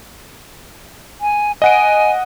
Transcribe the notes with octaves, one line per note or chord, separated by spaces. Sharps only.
G#5
D#5 F#5 G#5 D7